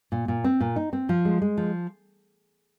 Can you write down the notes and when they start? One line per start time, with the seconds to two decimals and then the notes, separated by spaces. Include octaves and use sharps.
0.12 A#2
0.28 A#2
0.44 C4
0.60 A#2
0.76 D#4
0.93 C4
1.09 F3
1.25 G#3
1.42 G#3
1.57 F3